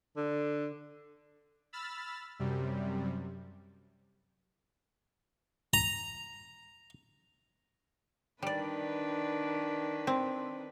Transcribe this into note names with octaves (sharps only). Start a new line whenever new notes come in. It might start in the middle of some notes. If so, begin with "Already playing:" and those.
D3
B5 E6 F6 A6
F#2 C3 G3
A#5
D#3 G3 D4 B4 D5
C4